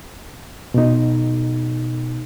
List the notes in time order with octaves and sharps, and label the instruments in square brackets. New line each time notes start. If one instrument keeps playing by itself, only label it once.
[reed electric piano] B2 D#4